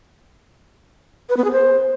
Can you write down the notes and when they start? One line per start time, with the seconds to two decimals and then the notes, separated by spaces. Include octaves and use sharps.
1.29 B4
1.37 B3
1.44 G#4
1.52 C5